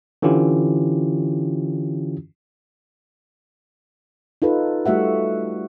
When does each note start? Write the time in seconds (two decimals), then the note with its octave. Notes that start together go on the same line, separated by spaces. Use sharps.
0.22 D3 E3 C#4 E4 F4 G4
4.42 D#4 F4 A4 B4
4.86 G3 A3 F#4 E5 F#5